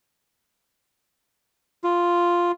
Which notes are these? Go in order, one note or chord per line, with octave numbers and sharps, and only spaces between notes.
F4